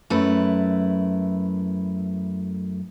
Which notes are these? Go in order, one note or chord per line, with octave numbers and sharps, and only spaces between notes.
F#2 A3 E4 B4